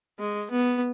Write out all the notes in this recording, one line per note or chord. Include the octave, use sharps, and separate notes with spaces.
G#3
B3